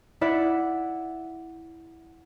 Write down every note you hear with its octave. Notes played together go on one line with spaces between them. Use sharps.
E4 D5 E5 F#5